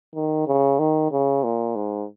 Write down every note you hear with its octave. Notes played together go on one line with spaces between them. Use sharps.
D#3
C#3
D#3
C#3
A#2
G#2